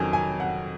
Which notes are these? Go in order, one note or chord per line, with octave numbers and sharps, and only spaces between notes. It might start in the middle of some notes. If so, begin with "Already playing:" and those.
Already playing: F2 D#3 F#3 C#4 G#5
G#5
F#5